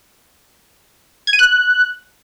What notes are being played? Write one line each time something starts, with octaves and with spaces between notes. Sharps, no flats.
G#6
D#7
F#6